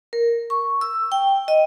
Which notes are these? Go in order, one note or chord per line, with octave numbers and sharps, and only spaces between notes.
A#4
C#6
E6
G5
D#5